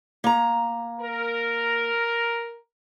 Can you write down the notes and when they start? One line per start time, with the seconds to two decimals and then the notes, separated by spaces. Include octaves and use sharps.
0.24 A#3 A#5
1.00 A#4